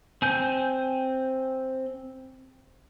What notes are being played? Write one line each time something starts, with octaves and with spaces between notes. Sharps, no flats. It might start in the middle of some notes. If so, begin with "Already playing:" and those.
C4 G#5 G6